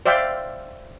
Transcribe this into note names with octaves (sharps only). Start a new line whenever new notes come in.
C5 D5 E5 F5 G5